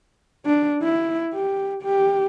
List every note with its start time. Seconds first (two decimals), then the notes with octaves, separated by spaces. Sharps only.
0.46 D4
0.83 E4
1.35 G4
1.83 G4